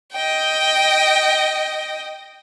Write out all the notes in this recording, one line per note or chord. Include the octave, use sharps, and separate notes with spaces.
D#5 G5